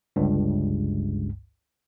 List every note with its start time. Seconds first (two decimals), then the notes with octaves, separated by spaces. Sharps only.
0.16 G1 C#2 G2